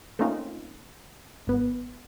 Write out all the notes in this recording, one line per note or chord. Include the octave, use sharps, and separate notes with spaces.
A3 A#3 C4 C#4 D#4 F4
G#1 B3